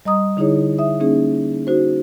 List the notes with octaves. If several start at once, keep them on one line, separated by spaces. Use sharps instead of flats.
G3 D#5 A#5 D#6
D3 D#4 E4 G#4 C#5
E5 D#6
A#3 C#4 D#4 G#4
D#4 F#4 C5